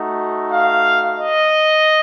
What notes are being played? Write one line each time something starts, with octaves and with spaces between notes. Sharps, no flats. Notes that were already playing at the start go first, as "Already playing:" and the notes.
Already playing: A3 D#4 F#4
F5
D#5